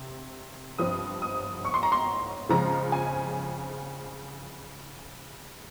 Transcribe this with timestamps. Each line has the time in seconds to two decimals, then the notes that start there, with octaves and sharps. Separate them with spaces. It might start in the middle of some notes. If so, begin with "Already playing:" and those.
Already playing: C3
0.78 G2 F3 C4 D#6
1.22 D#6
1.65 C#6
1.74 C6
1.83 A#5
1.92 C6
2.49 C#3 F3 G#3 C4 A#5
2.92 G#5